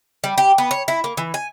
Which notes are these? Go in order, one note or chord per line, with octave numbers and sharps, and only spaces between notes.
G3
G4
B3
C#5
E4
A#3
E3
G#5